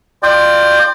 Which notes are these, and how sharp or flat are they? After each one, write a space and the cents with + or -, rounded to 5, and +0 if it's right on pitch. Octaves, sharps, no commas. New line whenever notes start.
F4 +0 D5 +35 G5 +5